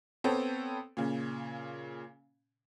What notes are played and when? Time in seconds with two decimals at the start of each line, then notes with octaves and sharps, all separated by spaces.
0.24 B3 C4 A4 C#5 G5
0.97 A#2 C#3